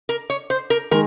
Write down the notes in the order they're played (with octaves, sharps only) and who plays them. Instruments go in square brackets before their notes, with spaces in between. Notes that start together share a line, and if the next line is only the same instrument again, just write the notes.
[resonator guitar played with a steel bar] A#4
C#5
C5
A#4
[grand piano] D#3 G#3 [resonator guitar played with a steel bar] A#4